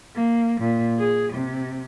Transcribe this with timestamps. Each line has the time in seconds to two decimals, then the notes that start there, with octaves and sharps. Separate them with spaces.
0.14 A#3
0.60 A#2
0.98 G#4
1.33 C3